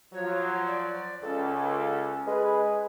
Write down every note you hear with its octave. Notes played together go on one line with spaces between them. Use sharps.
F3 F#3 C#5
D5
C#2 C#4 A4
G#3 G#4 B4